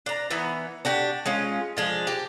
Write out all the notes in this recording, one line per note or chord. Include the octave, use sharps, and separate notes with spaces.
D4 A#5
E3 B3 D#4
D4 F#4 G4
G#3 C#4 F4
F3 G#3 D4
G4